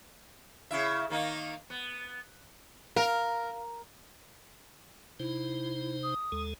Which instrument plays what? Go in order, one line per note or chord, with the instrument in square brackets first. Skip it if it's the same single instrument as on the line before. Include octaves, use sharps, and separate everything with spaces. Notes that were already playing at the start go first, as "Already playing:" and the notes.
[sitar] C#3 E4 E5
D#3 A#3 D#4
B3
[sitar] A#4 [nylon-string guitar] F5
[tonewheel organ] C3 D#4 C5 [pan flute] E4
[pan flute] D#6
[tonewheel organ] D#2 G#3 A4